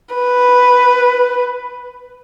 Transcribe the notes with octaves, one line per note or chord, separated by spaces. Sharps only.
B4